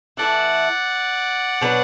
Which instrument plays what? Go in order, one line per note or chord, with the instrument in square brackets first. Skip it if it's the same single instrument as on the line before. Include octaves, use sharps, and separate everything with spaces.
[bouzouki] E3 A3 E4 [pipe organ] D5 F#5
[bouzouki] B2 F#3 D4 B4